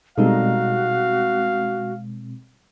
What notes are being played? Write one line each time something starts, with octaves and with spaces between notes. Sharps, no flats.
B2 G3 G#3 C4 D#4 F#4 A4 F5